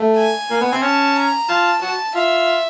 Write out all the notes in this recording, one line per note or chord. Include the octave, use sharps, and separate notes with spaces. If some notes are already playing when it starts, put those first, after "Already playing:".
Already playing: A3
G#5
A#3
B3
C4
C#4 A5
A#5
F4 A5
F#4 A5
F4 E5